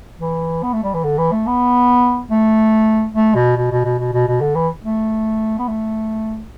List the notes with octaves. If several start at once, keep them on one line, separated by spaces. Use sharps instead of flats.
E3
B3
A3
G3
E3
D3
E3
A3
B3
A3
A3
B2
B2
B2
B2
B2
B2
B2
D3
E3
A3
B3
A3